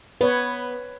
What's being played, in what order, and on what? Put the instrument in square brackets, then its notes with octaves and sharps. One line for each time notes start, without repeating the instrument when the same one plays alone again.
[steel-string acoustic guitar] B3 [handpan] B4 C#5